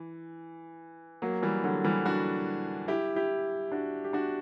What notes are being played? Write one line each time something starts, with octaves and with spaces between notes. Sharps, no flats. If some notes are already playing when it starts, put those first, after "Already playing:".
Already playing: E3
F#3 A#3
E3 G3
D3 F#3
E3 G3
D4 F#4
E4 G4
E4 G4
D4 F#4
G4
D4 F#4